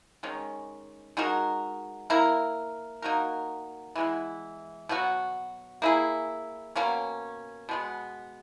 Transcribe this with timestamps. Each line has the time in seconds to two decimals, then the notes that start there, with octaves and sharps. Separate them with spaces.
0.23 D#3 G#3 C#4
1.17 G#3 D#4 F#4 A#4
2.10 A#3 E4 A#4
3.02 A#3 D#4 F#4 A#4
3.96 E3 G#3 B3 E4
4.89 B2 F#3 B3 F#4
5.82 A#3 E4 G#4
6.76 B2 A#3 C#4
7.69 B2 G#3 B3